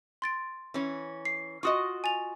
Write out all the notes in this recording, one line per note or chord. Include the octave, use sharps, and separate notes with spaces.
C6 A6 D7
E3 C#4
C7
F4 F#4 D#5 C#6 D#6
G#5 A6 F7